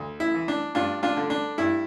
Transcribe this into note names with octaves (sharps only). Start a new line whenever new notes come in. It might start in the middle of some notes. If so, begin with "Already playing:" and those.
Already playing: D2
E4
E3
D4
G2 D4 F4
D4 F4
D3
D4
G2 E4